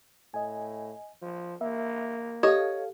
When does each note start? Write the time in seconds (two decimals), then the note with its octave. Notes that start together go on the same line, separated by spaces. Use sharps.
0.34 A2 D#5 G#5
1.22 F3
1.61 A#3 E5
2.43 G4 A4 C#5 D#5 F5